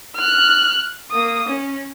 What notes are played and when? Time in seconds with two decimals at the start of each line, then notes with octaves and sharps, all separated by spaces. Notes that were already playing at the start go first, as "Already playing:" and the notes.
0.16 F6 F#6
1.11 A#3 D#6
1.48 C#4